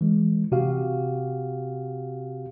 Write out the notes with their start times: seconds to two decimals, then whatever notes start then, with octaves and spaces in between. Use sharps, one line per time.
0.01 E3 G#3
0.52 C3 F#4 G4 F5